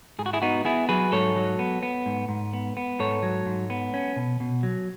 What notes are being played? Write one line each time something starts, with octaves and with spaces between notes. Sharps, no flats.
G#2 G#4
F#4
E4 G#4
B3 D#4 F#4
B3 E4 G#4
F#3 G#4 B4
G#2 A4 C#5
F#3
B3
B3
G#2
G#2
B3
B3
G#2 A4 C#5
F#3
G#2
B3
C#4
B2
B2
F#3